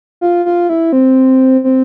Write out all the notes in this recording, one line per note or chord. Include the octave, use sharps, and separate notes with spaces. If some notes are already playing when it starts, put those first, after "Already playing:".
F4
F4
E4
C4
C4